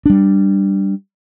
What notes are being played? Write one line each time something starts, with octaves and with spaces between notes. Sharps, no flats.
G3 D4